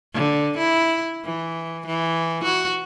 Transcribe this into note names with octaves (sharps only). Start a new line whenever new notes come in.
D3
E4
E3
E3
F#4